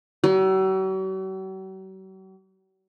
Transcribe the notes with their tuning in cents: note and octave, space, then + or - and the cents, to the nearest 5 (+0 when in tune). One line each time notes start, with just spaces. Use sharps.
F#3 +45